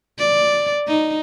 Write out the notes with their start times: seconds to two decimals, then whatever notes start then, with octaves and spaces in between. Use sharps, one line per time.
0.19 D5
0.87 D#4